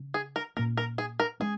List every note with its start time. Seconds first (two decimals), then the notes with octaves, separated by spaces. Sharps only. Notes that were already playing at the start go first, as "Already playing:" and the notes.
Already playing: C#3 C#4
0.14 G#4
0.36 A#4
0.57 A#2 A#3 C#4 A#4
0.77 A#4
0.98 G#4
1.20 A#4
1.40 G#3 C#4 G#4